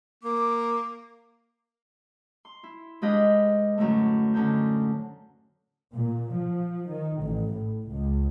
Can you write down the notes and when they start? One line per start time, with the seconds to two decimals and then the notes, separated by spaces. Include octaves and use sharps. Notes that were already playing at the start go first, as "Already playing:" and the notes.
0.23 A#3 D6
2.45 C6
2.63 E4
3.02 G#3 D4 G4 B4 D#5 F5
3.78 F#2 A2 D3 A3
4.34 D3 C#4 D#4 C5
5.94 A#2
6.33 F3
6.86 D#3
7.21 A1
7.51 A2
7.87 C#2